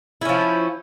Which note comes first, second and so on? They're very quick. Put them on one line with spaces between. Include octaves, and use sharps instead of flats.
E4 C#4 F3